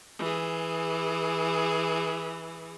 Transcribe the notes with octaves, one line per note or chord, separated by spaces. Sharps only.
E3 G#4